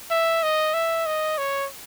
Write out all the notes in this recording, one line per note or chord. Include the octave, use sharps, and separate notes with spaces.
E5
D#5
E5
D#5
C#5